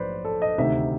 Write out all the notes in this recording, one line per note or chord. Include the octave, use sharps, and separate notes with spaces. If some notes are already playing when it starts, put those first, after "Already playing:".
Already playing: A#1 G#2 F#3 B4 C5 D5
A4
D#5
D2 C3 D#3 E5